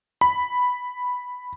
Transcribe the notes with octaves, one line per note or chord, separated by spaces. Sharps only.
B5